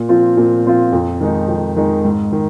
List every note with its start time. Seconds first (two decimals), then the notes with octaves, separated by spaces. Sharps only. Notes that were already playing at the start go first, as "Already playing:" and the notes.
Already playing: A#2
0.09 F3 C4 F4
0.37 A#2
0.65 F3 C4 F4
0.92 F2
1.21 D#3 G#3 D#4
1.48 F2
1.76 D#3 G#3 D#4
2.05 G#2
2.32 D#3